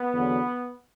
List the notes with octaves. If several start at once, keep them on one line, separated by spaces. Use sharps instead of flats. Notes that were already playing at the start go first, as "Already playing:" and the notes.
Already playing: B3
E2 D3 F#3